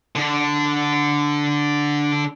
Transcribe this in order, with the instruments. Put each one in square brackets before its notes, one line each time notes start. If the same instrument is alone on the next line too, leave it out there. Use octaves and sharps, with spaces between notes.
[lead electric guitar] D3 D4